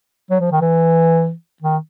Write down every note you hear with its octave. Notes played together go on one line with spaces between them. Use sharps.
F#3
F3
D#3
E3
D#3